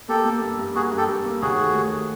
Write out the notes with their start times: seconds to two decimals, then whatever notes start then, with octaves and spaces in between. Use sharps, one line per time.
0.08 A#3 G4 A4
0.25 A#3
0.42 G2
0.59 G2
0.75 A#3 F#4 G#4
0.92 G2
0.98 G4 A4
1.09 G2
1.25 A#3
1.42 D#2 F#4 G#4
1.59 A3
1.75 D#2